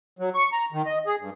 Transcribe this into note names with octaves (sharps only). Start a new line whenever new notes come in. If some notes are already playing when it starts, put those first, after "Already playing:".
F#3
C#6
A#5
D#3
D#5
G#4
G2